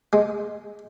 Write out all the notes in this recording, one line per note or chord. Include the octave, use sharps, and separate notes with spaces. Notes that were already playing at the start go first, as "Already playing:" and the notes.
G#3